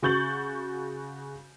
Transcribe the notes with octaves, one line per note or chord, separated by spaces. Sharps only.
C#3 F#4 C#6 G6 A6 F#7